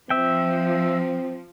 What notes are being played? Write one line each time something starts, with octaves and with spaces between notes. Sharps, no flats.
F3 C4 E5 G5